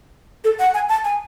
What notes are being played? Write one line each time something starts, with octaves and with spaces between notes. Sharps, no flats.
A4
F#5
G#5
A5
G#5